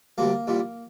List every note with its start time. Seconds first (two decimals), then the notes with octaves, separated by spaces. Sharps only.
0.18 D2 C3 G3 A#3
0.47 C2 A#2 G3